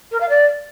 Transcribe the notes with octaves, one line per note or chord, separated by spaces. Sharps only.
A#4
F5
D5